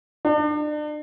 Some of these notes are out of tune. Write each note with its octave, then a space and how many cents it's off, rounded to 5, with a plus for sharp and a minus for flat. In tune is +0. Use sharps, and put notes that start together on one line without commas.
D4 +40